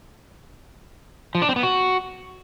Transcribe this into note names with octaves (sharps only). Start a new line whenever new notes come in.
F3
D4
C4
B3
F#4